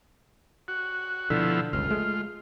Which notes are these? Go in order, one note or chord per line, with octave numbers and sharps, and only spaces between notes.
F#4
B2 D3 F3 E4
G1 C#2 F4
G#3 A3